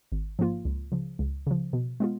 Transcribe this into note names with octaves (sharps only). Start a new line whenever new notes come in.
G#1
G#2 F3 A#3 F4
C#2
C#3 F3
C#2
C#3 F3
B2
G#3 B3 F4